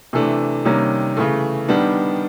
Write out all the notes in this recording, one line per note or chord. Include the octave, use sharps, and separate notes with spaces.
C3 E3 A3 D4
C3 D#3 G3 A#3 C#4
C#3 E3 A3
D#3 G3 B3 D4